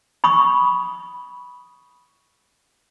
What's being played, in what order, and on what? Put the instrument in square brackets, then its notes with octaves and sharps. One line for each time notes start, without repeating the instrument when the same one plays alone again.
[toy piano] B5 C#6 D#6